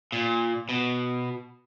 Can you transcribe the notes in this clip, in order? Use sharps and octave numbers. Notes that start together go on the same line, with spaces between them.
A#2
B2